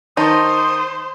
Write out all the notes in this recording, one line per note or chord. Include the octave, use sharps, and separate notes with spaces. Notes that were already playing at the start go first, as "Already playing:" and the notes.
D#3 D#4 C5 A5 C#6 D#6